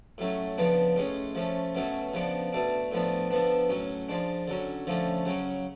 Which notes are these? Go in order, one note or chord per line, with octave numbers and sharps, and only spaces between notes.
A2 F#3 A3 C#4
C#3 F3 B3 D4
A2 G#3 C#4
F3 A3 C#4
B2 F#3 A3 C#4
C#3 F3 B3 D4
B2 A3 D4
A2 F3 B3 D4
D3 F3 B3 D4
A2 F#3 C#4
F3 G#3 D4
D3 F#3 C#4
D3 F3 A3 C#4
C#3 F#3 C#4